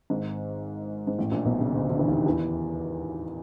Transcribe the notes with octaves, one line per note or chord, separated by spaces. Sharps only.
G#1 G#2
G#2
A1 A2
A#1 A#2
B1 B2
C#3
D2 D3
D2 D3
E3
D#2 D#3
E2 E3